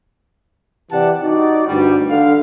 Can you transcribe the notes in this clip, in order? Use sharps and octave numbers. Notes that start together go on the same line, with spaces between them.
C3 E3 G4 D5 F#5 A5
D#4 F#4 D5
D2 G2 G3
D3 F5